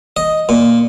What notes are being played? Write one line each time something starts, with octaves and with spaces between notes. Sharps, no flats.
D#5
A#2